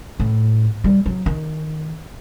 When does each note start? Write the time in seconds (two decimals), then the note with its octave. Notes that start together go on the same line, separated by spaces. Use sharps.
0.20 A2
0.84 G3
1.06 F#3
1.26 D#3